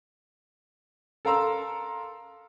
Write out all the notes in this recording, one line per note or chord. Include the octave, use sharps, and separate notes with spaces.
A4 A#4 F5 A#5 C6 E6